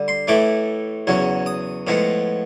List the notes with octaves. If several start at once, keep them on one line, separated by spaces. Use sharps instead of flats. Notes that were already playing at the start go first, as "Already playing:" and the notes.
Already playing: D3 G3
C6
A2 E3 A3 D6
E2 C#3 F#3
D#6
A2 F3 G#3 B3